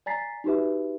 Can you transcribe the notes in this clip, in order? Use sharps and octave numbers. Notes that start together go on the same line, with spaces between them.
D5 G#5 A#5 A6 B6 C7
D#4 F#4 G4 B4 E5